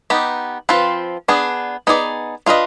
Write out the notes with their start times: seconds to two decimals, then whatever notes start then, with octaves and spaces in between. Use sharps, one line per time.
0.10 B3 D#4 G4
0.69 F3 C4 F4 B4
1.28 B3 D4 G#4
1.87 B3 D#4 G#4 D5
2.46 D4 F4 B4 D#5